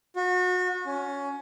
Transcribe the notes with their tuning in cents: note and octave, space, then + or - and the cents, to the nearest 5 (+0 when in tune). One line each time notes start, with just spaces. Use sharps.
F#4 -30
C#4 +15